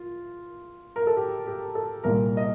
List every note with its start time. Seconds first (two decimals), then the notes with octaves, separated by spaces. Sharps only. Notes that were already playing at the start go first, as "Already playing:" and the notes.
Already playing: F4
0.96 A#4
1.07 A4
1.17 G4
1.47 G4
1.75 A4
2.04 C2 A#2 G3 A#4
2.37 D#5